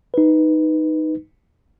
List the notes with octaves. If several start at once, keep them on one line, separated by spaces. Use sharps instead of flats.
D#4 B4